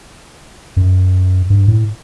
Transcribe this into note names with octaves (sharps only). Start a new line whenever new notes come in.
F#2
G2
A2